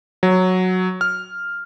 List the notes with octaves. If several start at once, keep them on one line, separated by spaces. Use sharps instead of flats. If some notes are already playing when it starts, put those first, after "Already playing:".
F#3
F6